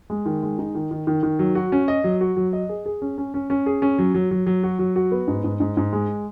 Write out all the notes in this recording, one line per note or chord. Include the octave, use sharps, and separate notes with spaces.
G#3
D#3
G#3
D#4
D#3
D#3
D#3
D#3
F#3
F#4
C#4
D#5
F#3
F#4
F#3
D#5
G#4
G#4
C#4
C#4
C#4
C#4
G#4
C#4
F#3
F#3
F#3
F#3
F#4
F#3
F#4
B3
G#2
G#2
G#2
G#2
G#3